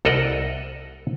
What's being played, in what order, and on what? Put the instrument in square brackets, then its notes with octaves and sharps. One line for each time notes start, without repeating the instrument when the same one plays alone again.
[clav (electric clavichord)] C2 A4 A#4 D#5 F#5